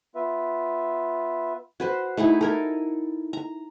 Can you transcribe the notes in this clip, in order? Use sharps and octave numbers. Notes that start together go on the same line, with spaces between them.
B3 F4 B4 E5
F#4 B4 C5
A3 D#4 E4 G#4
A4 A#4 G#5
A#5